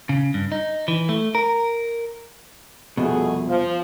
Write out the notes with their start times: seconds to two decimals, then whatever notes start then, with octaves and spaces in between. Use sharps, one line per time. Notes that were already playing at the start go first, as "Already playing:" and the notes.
0.09 C#3
0.34 G2
0.52 D#4
0.88 E3
1.09 A3
1.35 A#4
2.97 C2 F2 B2 A3 F#4 G#4
3.47 F3